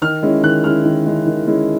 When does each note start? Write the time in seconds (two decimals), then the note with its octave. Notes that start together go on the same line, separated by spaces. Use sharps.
0.02 D#3 F6
0.22 G#3 C#4 E4
0.43 D#3 F#6
0.64 G#3 C#4 E4 F6
0.84 D#3
1.06 G#3 C#4 E4
1.26 D#3
1.47 G#3 C#4 E4